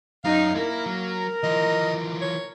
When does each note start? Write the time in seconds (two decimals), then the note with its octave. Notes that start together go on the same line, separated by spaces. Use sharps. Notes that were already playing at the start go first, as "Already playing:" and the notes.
0.24 F#2 D#4 F5
0.55 A#3 E4 A#4
0.86 F#3
1.43 E3 F3 D#5
2.22 C#5